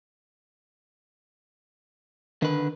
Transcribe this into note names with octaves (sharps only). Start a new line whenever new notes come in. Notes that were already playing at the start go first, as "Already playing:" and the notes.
D3 D#3 B4